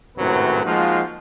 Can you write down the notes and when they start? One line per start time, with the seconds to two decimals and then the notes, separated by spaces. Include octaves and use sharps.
0.17 G#1 F#2 A2 C3 F#3 B4
0.64 F3 G#3 A#3 D#4 F4 F#4